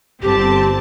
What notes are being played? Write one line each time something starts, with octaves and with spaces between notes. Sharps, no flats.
G1 C4 G4 A5